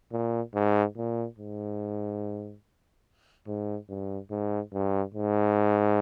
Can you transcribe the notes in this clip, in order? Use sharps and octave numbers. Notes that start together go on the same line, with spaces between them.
A#2
G#2
A#2
G#2
G#2
G2
G#2
G2
G#2